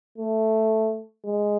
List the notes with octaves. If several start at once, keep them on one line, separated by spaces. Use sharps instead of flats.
A3
G#3